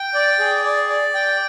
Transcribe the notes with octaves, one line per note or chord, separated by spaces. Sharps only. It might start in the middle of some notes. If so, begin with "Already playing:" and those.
Already playing: G5
D5
G#4
D5
D5
G5